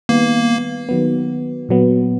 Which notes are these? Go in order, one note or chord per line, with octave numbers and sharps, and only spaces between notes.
D#3 G3 A#3 B3
D#3 F#3 B3
A#2 F#3 B3